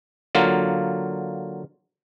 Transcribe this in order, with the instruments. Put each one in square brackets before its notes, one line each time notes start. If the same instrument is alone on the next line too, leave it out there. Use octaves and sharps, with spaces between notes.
[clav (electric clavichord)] D3 F#3 A#3 F4